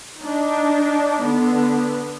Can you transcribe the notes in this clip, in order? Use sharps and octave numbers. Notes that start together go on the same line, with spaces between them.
D4 D#4
D3 B3